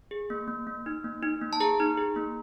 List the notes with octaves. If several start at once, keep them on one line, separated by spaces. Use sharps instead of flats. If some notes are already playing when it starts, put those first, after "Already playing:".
G#4
A#3
A#3
A#3
D#4
A#3
D#4
A#3
A5
G#4 A#5
D#4
G#4
A#3